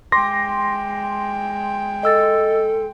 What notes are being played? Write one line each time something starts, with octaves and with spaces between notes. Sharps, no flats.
G#3 G5 C6 D6 A#6
A4 D#5 E6 A6